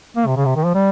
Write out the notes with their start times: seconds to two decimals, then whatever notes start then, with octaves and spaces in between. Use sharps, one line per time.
0.16 A#3
0.26 C3
0.36 C#3
0.45 C3
0.56 D#3
0.65 F3
0.75 G3